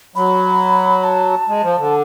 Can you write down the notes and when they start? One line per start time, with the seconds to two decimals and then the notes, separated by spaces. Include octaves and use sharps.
0.16 F#3 B5
1.04 A5
1.48 G#3
1.63 F3
1.78 D3